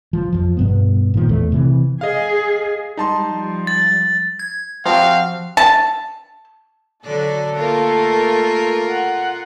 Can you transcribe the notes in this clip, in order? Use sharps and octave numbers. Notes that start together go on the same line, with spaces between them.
F3
F2 F3
G2 B2 B3
A#2 D#3 F3
E2 A3
C3 E3
G#4 D#5 F5
G3 D#4 A5 C6
F3 G3
A6
G#6
F3 C4 F#4 G4 F5
A5
D3 F#3 A4 D5
A3 A#3 F4 A#4
F#5